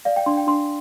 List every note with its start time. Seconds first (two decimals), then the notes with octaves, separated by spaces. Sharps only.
0.05 D5 F5
0.16 G5
0.26 D4 C6
0.37 G5
0.47 D4 C6